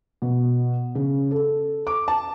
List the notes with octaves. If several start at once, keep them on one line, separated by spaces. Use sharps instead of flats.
B2
C#3
A4
D6
A5